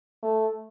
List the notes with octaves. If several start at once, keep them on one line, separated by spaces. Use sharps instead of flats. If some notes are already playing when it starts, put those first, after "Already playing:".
A3